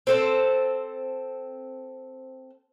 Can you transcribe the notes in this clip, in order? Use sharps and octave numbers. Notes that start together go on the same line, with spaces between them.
C4 A4 C5